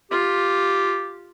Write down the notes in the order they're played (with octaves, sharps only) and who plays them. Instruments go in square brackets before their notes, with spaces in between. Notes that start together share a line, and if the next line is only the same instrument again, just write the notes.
[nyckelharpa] F4 [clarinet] G4